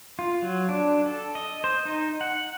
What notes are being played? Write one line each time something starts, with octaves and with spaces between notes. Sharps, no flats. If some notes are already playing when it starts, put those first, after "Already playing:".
F4
F#3
D4
A4
D#5
C5
D#4
F#5